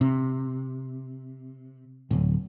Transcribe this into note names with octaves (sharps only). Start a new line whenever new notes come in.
C3
D1